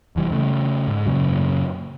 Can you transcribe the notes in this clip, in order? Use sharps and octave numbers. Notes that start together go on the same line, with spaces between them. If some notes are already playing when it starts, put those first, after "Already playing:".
F1 E3 G3
C#3 A3
G#2
F#2 A#2 C#3 F#3